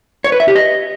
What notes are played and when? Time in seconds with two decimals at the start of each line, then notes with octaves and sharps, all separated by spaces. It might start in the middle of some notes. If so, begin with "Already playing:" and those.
0.24 C#5
0.32 B4
0.40 E5
0.48 G4
0.56 D#5